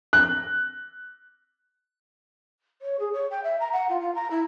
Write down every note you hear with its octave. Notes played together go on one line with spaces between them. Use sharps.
F#6
C#5
G#4
C#5
G5
E5
A#5
F#5
F4
F4
A#5
E4